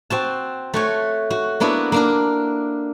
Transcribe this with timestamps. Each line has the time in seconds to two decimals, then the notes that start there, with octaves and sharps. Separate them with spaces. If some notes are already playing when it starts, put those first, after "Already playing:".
0.10 C4 F#4 A5
0.74 A3 F#4 C#5
1.30 F#4
1.60 A#3 B3 D4 E4 F#4
1.92 A#3 D4 A#4